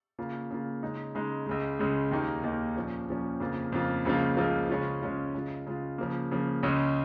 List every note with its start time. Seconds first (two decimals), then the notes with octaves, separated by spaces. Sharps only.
0.19 C#3 A#3 F4
0.50 C#3 A#3 F4
0.83 C#3 G#3 D#4
1.15 C#3 G#3 D#4
1.46 C#2 C#3 G#3
1.79 C#2 C#3 G#3
2.11 D#2 D#3 A#3 D#4
2.43 D#2 D#3 A#3 D#4
2.76 A#2 F3 C#4
3.08 A#2 F3 C#4
3.40 F2 C#3 A#3 F4
3.72 F2 C#3 A#3 F4
4.05 C#2 C#3 F3 A#3 F4
4.37 C#2 C#3 F3 A#3 F4
4.70 C#3 G#3 C#4 F4
5.02 C#3 G#3 C#4 F4
5.34 C#3 G#3 F4
5.67 C#3 G#3 F4
5.98 C#3 F3 A#3
6.31 C#3 F3 A#3
6.63 C#2 C#3 G#3 C#4